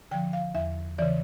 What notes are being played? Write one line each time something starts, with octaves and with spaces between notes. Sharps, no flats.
D3 F3 G5
F5
E2 E5
C#3 E3 D5